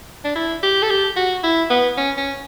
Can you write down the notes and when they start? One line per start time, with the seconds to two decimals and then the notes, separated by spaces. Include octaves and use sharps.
0.24 D4
0.36 E4
0.63 G4
0.82 A4
0.90 G4
1.16 F#4
1.43 E4
1.70 B3
1.97 C#4
2.17 C#4